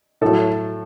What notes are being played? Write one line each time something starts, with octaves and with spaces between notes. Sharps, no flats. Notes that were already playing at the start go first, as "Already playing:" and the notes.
A2 F#3 A4